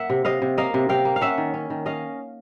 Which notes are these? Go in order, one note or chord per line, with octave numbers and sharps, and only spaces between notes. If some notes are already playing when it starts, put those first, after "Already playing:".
Already playing: A#3 E5 F#5
C3
C3 D#5 F5
C3
A#3 D#5 F5
C3
C3 F5 G5
A#3
F5
C#4 E5 F#5
D#3
C#4
D#3
C#4 D#5 F5